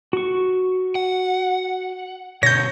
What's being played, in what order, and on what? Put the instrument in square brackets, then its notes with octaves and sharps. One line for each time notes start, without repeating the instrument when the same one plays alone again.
[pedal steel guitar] F#4 C#6
[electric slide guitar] F#5
[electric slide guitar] B2 D3 [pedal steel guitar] C#5 [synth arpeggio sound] G6 A#6